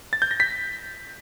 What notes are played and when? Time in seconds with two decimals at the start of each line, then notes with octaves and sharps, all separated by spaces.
0.13 A6
0.22 G6
0.31 A#6
0.40 B6